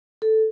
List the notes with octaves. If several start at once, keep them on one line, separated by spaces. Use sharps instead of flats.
A4